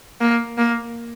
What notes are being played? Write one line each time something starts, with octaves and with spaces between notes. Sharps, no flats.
A#3
A#3